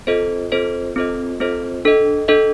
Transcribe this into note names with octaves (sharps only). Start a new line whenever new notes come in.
C4 F4 A4 C5 D#5
C4 F4 A4 C5 D#5
C4 F4 A4 C5 D#5
C4 F4 A4 C5 D#5
D4 A4 D#5
D4 A4 D#5